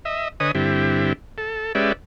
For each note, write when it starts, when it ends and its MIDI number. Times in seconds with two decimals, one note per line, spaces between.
0.05 0.28 75
0.05 0.28 76
0.40 0.52 50
0.40 0.52 71
0.40 0.52 73
0.40 0.52 75
0.40 0.52 80
0.40 0.52 87
0.55 1.13 43
0.55 1.13 50
0.55 1.13 60
0.55 1.13 64
0.55 1.13 67
1.38 1.73 69
1.75 1.92 56
1.75 1.92 61
1.75 1.92 67
1.75 1.92 71
1.75 1.92 74
1.75 1.92 76